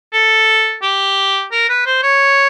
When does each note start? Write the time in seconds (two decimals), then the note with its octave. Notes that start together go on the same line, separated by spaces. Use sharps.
0.13 A4
0.83 G4
1.52 A#4
1.69 B4
1.86 C5
2.03 C#5